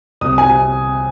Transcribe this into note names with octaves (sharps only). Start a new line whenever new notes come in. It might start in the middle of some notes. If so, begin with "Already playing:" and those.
C2 D#6
G#5
C3